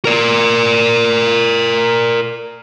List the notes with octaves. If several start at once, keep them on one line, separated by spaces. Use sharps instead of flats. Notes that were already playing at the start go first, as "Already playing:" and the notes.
A#4 D5